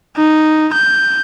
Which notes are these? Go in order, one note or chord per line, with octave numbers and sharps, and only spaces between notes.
D#4
G6